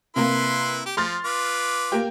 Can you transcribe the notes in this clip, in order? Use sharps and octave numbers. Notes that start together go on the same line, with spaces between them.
C3 A#3 E4 B4 C6
G4
F3 C6 F6 A6
F4 B4 D6
A#3 G4 G5